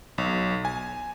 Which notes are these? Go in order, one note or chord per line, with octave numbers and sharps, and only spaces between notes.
B1
G#5